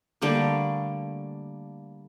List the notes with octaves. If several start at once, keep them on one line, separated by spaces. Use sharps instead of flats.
D3 G3 A3 A#3